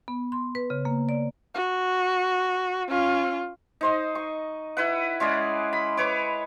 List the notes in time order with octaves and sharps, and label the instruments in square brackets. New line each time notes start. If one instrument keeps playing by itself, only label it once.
[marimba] B3
C6
B4
C#3
A#3
D5
[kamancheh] F#4
C#4 F4
[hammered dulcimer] D#4 C5 D#5
C#6
E4 B4 F#5
G#3 C#4 G#4 D5
B5
B4 C#5 D6